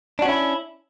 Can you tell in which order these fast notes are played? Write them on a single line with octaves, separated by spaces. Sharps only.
D4 F#4 C#4 E4